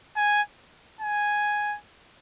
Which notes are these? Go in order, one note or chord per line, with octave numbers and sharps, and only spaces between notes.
G#5
G#5